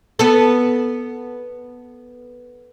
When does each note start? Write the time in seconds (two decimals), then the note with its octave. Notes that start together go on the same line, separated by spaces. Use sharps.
0.19 B3 A4